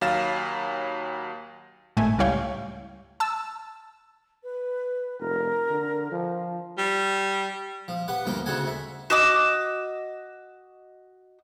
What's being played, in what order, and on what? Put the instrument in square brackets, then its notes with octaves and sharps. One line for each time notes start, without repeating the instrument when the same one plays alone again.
[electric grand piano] D#2 F#3 F5 A6 E7
[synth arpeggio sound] G#1 A2 A3 G#5
C#2 G3 E4 C#5 F5 G5
A5 E6
[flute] B4
[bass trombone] F1 [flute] A#4
[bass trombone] D3
F3
[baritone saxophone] G3
[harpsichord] F3
G4 B4 F#5
D2 G2 F3 A#3 G5
D2 C#3 C4 A4 F#5 G#5
E5
[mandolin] F#4 D#5 D6 E6